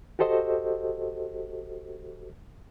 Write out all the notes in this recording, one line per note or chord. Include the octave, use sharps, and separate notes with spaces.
F#4 G4 A4 C5 D#5